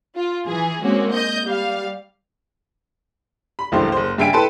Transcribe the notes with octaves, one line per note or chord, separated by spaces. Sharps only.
F4
E3 G#4
G#3 A#3 C4 C#4 F#4
D#5 G6
G3 F5
B5
F#1 C#2 G2 E3 A3 C5
F#1 C5
G2 C#3 E5 G5 G#5 D7
E4 A4 B4 G5 A5 C6